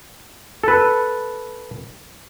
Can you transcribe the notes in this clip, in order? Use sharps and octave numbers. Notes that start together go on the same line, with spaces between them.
A4 B4